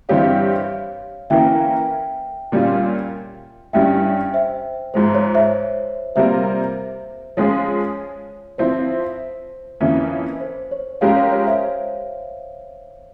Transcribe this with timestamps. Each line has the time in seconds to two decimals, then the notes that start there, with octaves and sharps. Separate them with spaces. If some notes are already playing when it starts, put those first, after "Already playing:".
0.09 G2 E3 G3 C4 G4 C#5 F5
1.30 E3 A#3 C#4 E4 A#4 E5 G5
2.52 A#2 G3 C#4 F4
3.73 G2 G3 C#4 E4 E5 G5
4.34 C5 E5
4.94 G#2 F3 G#3 C5
5.15 C#5
5.35 C5 E5
6.16 C3 G3 A#3 F4 A#4 C5 E5
7.37 F3 G#3 C#4 F4 G#4 C#5
8.58 F3 C4 E4 C5
9.80 F2 E3 A#3 C#4 E4
10.41 C5
10.71 C#5
11.01 F3 G#3 C#4 G4 A#4 C#5 F5
11.16 C#5
11.32 C#5
11.47 C5 E5